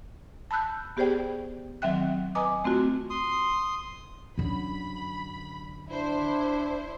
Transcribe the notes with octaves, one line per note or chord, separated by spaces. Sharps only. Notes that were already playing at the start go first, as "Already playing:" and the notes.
A5 B5 E6 F#6 G6
B3 G4 G#4 C5 D5 G5
D#3 F#3 C4 E5 G5 F#6
B4 D#5 G#5 A#5 D6 D#6
A3 C4 F4 F#4
C6 D#6
F#2 D3 B5
D4 E4 C5